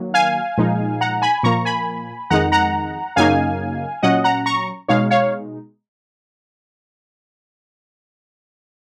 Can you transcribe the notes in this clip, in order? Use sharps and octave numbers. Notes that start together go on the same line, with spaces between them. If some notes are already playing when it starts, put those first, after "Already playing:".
Already playing: D#3 F#3 A#3
F5 G#5
A#2 F3 G#3 D#4
F#5 A#5
G#5 B5
A#2 F3 A#3 A#5 C#6
G#5 B5
F2 D#3 G#3 D#4 F#5 A#5
F#5 A#5
F#2 C#3 F#3 A#3 D#4 F5 G#5
A#2 F#3 C#4 D#5 F#5
F#5 A#5
A#5 C#6
B2 G#3 D#4 C#5 F5
C#5 F5